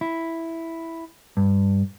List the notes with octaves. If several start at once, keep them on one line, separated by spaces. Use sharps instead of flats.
E4
G2